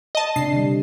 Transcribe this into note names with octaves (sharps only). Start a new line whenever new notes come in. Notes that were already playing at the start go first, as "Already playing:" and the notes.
D#5 A5
C3 D4 C7
D3 G3